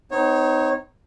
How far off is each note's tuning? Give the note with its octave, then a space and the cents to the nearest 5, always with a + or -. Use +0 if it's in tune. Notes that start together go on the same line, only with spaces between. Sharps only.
B3 +45 D#4 +0 C#5 -20